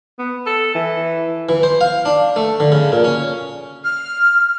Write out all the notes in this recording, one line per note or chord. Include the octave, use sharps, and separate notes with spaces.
B3
A4
E3
E3
C5
F5
D4
A3
D3
C#3
A#2
C#4
F6